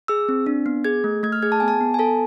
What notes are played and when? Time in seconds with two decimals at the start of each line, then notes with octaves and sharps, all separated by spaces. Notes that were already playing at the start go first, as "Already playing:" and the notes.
0.08 G#4 E6
0.29 C4
0.46 D4
0.66 B3
0.84 G#4 G#6
1.04 A3
1.23 A3 G#6
1.32 F6
1.42 G#4 G#6
1.52 A5
1.60 B3 G#5
1.68 A5
1.81 B3
1.94 G#5
1.99 A4 A5